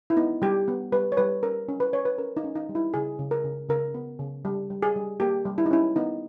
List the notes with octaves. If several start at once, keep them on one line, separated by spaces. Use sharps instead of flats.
E4
B3 D#4
G3 G4
B3
G3 B4
C#5
G3 B4
C#4 A#4
C#4
B4
C#4 C#5
B4
C#4 A#4
D#4
C#4
D#4
G3
E4
C#3 G#4
C#3
A#4
C#3
C#3 A#4
B3
C#3
G3
G3
G#4
G3
A#3 G4
G3
E4
D#4
C#4 E4
B3 D#4